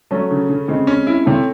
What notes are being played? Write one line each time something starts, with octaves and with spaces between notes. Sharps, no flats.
F#3 A3 C#4
C#3
C#3
C#3 G#3 C4
C#4
E4
C3 A3 C#4